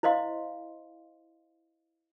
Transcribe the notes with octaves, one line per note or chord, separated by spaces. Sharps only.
E4 C5 D#5 F5 C6